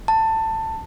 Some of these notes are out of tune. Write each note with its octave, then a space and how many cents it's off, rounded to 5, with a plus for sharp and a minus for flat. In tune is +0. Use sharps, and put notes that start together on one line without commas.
A5 +20